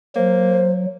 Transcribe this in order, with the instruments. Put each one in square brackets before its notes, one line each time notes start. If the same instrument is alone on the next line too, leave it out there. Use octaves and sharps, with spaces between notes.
[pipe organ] F#3 [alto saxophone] A#3 [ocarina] C5